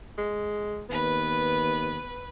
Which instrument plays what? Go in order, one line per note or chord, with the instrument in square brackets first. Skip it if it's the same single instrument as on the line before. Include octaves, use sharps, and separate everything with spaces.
[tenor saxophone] G#3
[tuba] D#2 [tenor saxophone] B3 [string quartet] B4